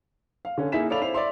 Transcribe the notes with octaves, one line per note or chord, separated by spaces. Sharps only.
F5
D3 C#4
A#3 D#4 E4 G#4 B6 E7
A4 C#5 D5 F5 B5 F7
C4 E4 C7 F7
D5 E5 C6